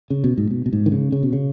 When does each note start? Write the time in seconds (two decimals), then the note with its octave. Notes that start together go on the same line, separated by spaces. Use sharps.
0.10 C#3
0.24 B2
0.38 G#2
0.51 B2
0.66 B2
0.73 G#2
0.86 D#3
0.92 C#3
1.12 C#3
1.23 B2
1.33 C#3